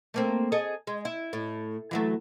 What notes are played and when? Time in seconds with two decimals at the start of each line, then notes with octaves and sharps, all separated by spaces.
0.14 A3 A#3 C4
0.52 G#4 A4 D#5
0.87 G#3
1.05 E4
1.33 A2
1.91 E3 F#3 A3